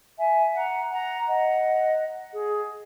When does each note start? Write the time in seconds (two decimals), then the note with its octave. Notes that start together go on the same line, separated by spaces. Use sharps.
0.19 E5 G#5
0.55 F#5 A#5
0.91 F#5 A#5
1.27 D#5 F#5
2.34 G#4